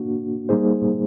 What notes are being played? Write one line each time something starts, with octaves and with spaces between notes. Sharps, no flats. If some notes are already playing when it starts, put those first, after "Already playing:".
Already playing: A#3 D4 F#4
G3 A#3 D#4 G#4 C5